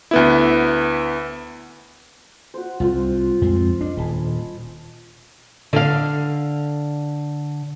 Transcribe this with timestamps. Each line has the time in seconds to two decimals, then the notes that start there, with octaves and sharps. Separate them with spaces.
0.11 D2 B3 E4
2.54 F#4 C5
2.80 C2 F4 C5
3.42 F2 G#3 C4
3.81 D4 D#5
3.97 D#1 G#5 A5 B5
5.73 D3 F5